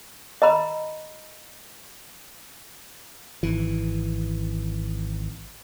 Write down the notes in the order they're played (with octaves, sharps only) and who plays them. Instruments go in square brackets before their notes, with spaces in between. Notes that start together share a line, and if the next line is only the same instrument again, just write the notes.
[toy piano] D#5 A#5 B5
[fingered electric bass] G#1 E3